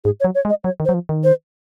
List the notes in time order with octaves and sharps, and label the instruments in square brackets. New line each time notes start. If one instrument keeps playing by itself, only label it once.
[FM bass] G#2 [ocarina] G#4
[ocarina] C#5
[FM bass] F#3
[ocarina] C#5
[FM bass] G#3
[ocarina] D#5
[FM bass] F#3 [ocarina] C#5
[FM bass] D#3
[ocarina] C5
[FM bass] F#3
F3
D#3
[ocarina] C5